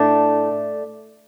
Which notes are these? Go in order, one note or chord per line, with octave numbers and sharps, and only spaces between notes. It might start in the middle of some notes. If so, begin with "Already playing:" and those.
Already playing: A2 A3 D4